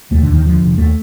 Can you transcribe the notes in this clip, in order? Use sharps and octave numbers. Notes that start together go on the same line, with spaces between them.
D#2 A3
D3
D#2
D#3
D3 F3
F1
D#2 A3